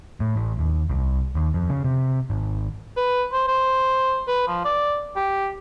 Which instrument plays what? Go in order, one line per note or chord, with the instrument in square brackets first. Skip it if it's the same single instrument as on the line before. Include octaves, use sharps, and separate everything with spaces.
[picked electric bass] A2
A1
D#2
C2
D#2
F2
C#3
C3
G#1
[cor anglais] B4
C5
C5
B4
F3
D5
G4